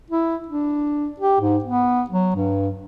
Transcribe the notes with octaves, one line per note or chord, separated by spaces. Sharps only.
E4
D4
G4
G#2
B3
F#3
G2